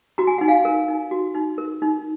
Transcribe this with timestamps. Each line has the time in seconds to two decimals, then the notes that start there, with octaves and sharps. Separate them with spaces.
0.18 F#4 A#5
0.27 G#5
0.38 D#4 F#5
0.48 F5 G#5
0.65 A#4
0.88 D#4
1.11 F#4
1.34 D#4
1.58 A#4
1.82 D#4